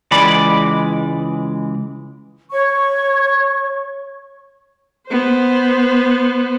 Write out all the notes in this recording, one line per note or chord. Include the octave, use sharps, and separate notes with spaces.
C#2 E3 G#3 D5 B5
C#5 C#6
B3 C5